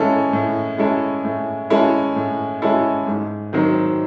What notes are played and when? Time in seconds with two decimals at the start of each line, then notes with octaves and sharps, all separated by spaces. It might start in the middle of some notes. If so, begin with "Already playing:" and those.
Already playing: A2 G#3 C#4 E4 A4
0.33 A2
0.78 G#3 C#4 E4 A4
1.25 A2
1.70 G#3 C#4 E4 A4
2.16 A2
2.62 G#3 C#4 E4 A4
3.07 G#2
3.53 D#3 F#3 C4